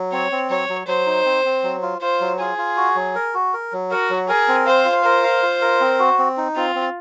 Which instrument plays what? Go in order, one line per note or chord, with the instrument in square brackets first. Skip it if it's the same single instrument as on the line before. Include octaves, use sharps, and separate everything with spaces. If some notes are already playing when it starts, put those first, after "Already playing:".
Already playing: [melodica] F#3
[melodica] C4 [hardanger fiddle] C#5
[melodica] C4
[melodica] F#3 [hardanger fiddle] C#5
[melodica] F#3
[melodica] F#3 [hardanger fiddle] C5
[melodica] D#4
C4
C4
F#3
F4
[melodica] F4 [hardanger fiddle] C5
[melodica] F#3
[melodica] F4 [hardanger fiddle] G#4
[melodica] F4
F#4
F#3
A#4
F#4
A#4
F#3
[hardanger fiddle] F#4 [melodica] A#4
[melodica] F#3
[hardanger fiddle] G#4 [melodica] A#4
[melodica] C4
[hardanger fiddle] C5 [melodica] F5
[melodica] F4
[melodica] A#4 [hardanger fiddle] C5
[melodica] F5
F4
A#4
C4
F#4
C4
D#4
[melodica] C4 [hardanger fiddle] F4
[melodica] C4